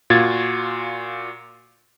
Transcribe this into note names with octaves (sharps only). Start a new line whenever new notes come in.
A#2 F4 F#4 G#6 A6